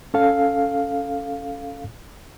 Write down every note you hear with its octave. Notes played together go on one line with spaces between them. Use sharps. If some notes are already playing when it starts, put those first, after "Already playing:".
C#4 A4 F5